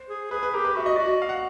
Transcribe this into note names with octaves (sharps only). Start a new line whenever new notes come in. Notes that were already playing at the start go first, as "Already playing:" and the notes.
Already playing: C5
G#4
G#4 B4
B4
G4 A#4
B4
F#4 E5
D#5
F#4 D5
D#5
F5
F#5